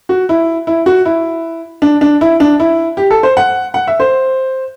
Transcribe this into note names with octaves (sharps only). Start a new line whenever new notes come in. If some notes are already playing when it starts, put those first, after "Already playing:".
F#4
E4
E4
F#4
E4
D4
D4
E4
D4
E4
G4
A4
C5
F#5
F#5
E5
C5